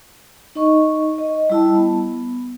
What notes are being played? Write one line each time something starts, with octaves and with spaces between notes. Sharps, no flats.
D#4 D#5 C#6
D#5
G3 E4 A5
B3